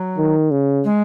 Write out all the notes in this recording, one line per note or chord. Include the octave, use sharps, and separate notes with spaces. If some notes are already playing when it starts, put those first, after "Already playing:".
Already playing: F#3
D#3
C#3
G#3